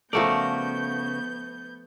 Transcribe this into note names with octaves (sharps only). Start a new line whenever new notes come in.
C#3 F3 A3 B3 F#4 A#4 D5 G6